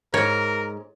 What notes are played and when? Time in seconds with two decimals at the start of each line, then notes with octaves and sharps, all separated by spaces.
0.14 G#2 A#4 C#5